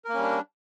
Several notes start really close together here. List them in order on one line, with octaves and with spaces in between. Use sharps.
A#4 A#3 C#4 G3 D4